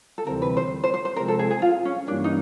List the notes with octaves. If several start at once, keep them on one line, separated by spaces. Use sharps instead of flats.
A4
D2 C3 E3 G3 C4 A#4
B4
C5
C5
C5
C5
C3 F3 G#3 C4 A#4
A4
G#4
G#4
F4
C#4
G2 E3 G3 A#3 C#4 D4
D#4